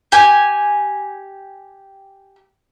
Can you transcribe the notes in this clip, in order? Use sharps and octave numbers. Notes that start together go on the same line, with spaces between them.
G4 G#5